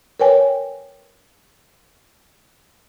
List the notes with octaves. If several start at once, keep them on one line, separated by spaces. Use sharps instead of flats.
A#4 B4 C#5 G5 G#5